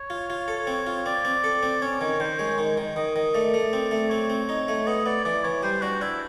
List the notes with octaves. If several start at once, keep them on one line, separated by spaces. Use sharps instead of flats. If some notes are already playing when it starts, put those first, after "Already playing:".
Already playing: C#5
F4
F4
A4
C4
F4
C4 D5
C4
A4
C4
C#4 C#5
D#3 C#5
D#3 C5
G#3 C#5
D#3
D#3
D#3 D#5
D#3
A3 D5
A3
C4
A3
C4 C#5
C4
D#4
A3
B3 D#5
B3 D5
E3 D5
E3 C#5
G3 C5
D4 F#4
D4 E4